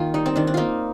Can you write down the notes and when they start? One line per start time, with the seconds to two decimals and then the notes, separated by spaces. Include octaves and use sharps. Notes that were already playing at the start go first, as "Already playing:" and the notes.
Already playing: D#3 A#3 F4
0.14 G3 D#4
0.26 C4
0.36 D#3 D4
0.47 D4
0.54 A#3 D#4 F4